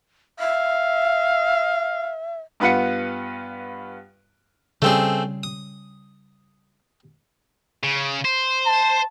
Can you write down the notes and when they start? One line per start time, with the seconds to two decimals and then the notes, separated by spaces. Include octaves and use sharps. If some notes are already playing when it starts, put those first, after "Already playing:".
0.39 E5 F5
2.60 G2 B3 F4 B4 F#5 C#7
4.82 C#3 G3 A3 C4 G#4
5.43 D#6
7.83 C#3
8.25 C5
8.66 A5